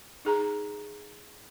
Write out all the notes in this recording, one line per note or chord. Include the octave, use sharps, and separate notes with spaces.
D#4 G#4 A#5